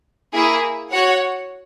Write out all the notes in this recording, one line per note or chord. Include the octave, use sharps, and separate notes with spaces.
A#3 E4 G#4
F#4 C#5 F#5